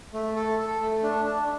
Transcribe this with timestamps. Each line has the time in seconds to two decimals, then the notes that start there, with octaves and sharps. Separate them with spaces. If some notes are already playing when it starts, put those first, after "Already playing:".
0.14 A3
0.36 A4
0.59 A4
0.81 A3
1.03 D4
1.25 D4